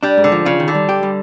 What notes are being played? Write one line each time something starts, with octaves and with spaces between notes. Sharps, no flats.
G3 D4
G#2
D3
F3
C#3 F4
D#3
D3
G3
G4
G3